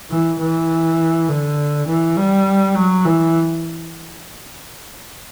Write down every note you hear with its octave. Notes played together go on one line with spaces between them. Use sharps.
E3
E3
D3
E3
G3
F#3
E3